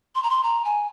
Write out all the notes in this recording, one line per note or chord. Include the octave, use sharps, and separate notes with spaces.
C6
A#5
C6
A#5
G#5